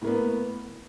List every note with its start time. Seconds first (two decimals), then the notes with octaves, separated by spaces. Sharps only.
0.02 A2
0.04 A#3
0.07 B3